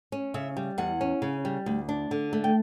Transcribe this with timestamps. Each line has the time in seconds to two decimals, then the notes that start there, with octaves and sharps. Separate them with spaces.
0.12 C#4
0.34 C#3 E5
0.57 G3
0.78 E2 F#5
1.01 C#4
1.22 C#3
1.45 G3
1.66 D2
1.89 D4
2.11 D3
2.33 A3
2.44 G5